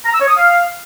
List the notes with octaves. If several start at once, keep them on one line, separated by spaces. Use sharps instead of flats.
A#5
E6
C#5
D#6
F5